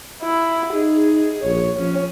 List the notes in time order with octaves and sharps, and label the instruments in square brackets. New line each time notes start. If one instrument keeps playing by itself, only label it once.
[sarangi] E4
[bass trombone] D#4 [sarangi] G#4
[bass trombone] A#1 [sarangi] C#5
[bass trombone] F3 [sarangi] C#4